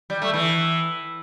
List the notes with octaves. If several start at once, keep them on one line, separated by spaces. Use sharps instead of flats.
G3
A3
E3